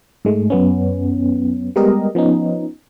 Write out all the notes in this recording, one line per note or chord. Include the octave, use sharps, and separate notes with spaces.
G#2 G#3 A3
F#2 B3 C#4
G3 G#3 B3 G4 A#4 D#5
F3 B3 C#4 D#4